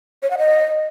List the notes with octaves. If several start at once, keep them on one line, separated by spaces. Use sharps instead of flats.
C#5
F#5
D#5